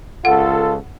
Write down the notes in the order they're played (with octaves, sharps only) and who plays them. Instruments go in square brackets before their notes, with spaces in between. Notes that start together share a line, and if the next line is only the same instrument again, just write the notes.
[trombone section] C#2 F4 A4 [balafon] F#5